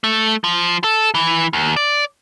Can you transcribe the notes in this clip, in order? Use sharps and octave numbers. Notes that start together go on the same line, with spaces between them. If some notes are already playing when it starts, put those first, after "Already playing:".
A3
F3
A4
E3
D#2
D5